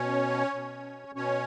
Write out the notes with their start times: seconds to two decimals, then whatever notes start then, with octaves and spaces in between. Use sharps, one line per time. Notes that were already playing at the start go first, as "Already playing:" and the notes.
Already playing: B2 C#4 C#5
0.55 B2
1.15 B2 C#4 C#5